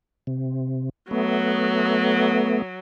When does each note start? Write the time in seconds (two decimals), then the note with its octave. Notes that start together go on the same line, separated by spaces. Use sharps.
0.27 C3
1.11 F#3 A3 B3